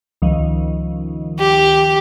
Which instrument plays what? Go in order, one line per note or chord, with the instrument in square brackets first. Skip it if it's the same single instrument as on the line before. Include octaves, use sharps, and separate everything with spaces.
[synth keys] C#2 D#3 F3
[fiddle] G4